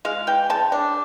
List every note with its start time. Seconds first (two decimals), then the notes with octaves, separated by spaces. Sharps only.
0.05 G#3 F5
0.27 E3 G5
0.50 C#3 A5
0.72 D4